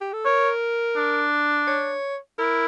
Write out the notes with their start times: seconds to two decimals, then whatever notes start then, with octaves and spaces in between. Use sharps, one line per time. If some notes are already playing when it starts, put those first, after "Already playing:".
0.01 G4
0.13 A4
0.25 A#4 C#5
0.96 D4
1.67 C#5
2.39 E4 A#4